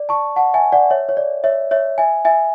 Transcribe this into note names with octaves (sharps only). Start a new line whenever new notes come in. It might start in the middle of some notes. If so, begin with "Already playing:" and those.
Already playing: D5
A5 C#6
F#5 A5
E5 G#5
D5 F#5
C#5 E5
C#5
D5
C#5 E5
C#5 E5
E5 G#5
E5 G#5